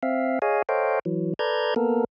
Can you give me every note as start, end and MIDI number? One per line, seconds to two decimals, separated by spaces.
0.03 0.39 60
0.03 0.39 76
0.03 0.39 77
0.42 0.62 68
0.42 0.62 73
0.42 0.62 75
0.42 0.62 77
0.42 0.62 80
0.69 0.99 69
0.69 0.99 72
0.69 0.99 73
0.69 0.99 75
0.69 0.99 77
0.69 0.99 79
1.05 1.34 52
1.05 1.34 54
1.39 1.74 69
1.39 1.74 71
1.39 1.74 74
1.39 1.74 82
1.39 1.74 91
1.39 1.74 92
1.76 2.04 58
1.76 2.04 59
1.76 2.04 69
1.76 2.04 70